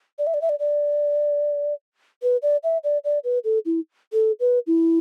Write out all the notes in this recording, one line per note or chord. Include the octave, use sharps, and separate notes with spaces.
D5
E5
D5
E5
D5
D5
B4
D5
E5
D5
D5
B4
A4
E4
A4
B4
E4